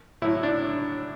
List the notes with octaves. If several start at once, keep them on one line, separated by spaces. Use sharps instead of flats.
A2 F#3 E4
D4